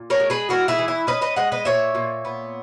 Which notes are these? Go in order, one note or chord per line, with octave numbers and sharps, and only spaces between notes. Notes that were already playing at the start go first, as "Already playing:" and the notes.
Already playing: A#2
A#4 C#5
G#3
G#4 B4
E3 F#4 A#4
E4 G#4
E3
E4
C#4 B4 D#5
B4 D#5
G#3 D#5 F#5
B4 D#5
A#2 C#5 E5
A#2
B3